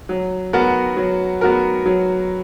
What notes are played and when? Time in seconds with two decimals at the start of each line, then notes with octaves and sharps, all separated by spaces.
0.09 F#3
0.53 B3 F#4 A#4
0.97 F#3
1.41 B3 F#4 A#4
1.86 F#3